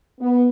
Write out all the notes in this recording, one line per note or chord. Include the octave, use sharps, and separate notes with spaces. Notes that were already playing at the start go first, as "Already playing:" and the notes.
B3